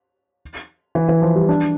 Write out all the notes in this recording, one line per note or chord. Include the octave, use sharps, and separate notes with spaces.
E3
E3
F3
G3
D4